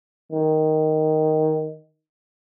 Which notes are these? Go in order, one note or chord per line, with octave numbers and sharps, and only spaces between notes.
D#3